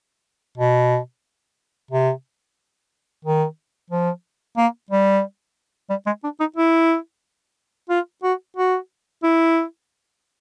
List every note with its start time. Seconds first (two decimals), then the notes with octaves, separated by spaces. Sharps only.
0.58 B2
1.91 C3
3.25 D#3
3.90 F3
4.57 A#3
4.91 G3
5.90 G3
6.06 G#3
6.24 D4
6.40 D#4
6.56 E4
7.89 F4
8.23 F#4
8.57 F#4
9.23 E4